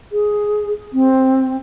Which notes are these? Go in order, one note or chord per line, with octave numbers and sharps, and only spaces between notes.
G#4
C4